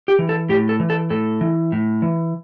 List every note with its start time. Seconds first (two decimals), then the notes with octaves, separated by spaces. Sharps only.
0.08 G4
0.19 E3
0.29 A4
0.49 A2 G4
0.69 A4
0.80 E3
0.90 A4
1.10 A2 A4
1.41 E3
1.72 A2
2.02 E3